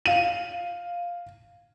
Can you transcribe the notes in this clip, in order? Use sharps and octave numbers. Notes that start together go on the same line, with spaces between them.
F5 D#7